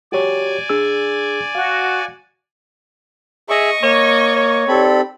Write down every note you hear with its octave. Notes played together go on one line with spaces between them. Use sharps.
F#4 G4 C#5 D5 G#5
D4 G#4 E6
F#4 F5
G#4 D#5 E5 C#6
A#3 C#5
C#5
C4 D#4 G4 A4 D5 B5